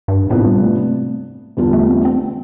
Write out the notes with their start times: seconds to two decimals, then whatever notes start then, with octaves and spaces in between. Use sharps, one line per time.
0.08 G2
0.30 A2 C3 F3 B3 D4
0.46 G3
0.62 A3
1.57 E2 D3 G3 B3 F4
1.73 A3
1.88 C4
2.05 C4